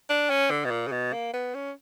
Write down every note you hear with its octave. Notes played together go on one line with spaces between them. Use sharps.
D4
C#4
D3
B2
A#2
C#3
B2
A#3
B3
C#4